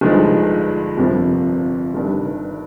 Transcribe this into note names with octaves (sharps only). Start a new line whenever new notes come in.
G1 G2 F3 G#3 D#4
G1 F2 C3 F3 A#3
G1 G2 D#3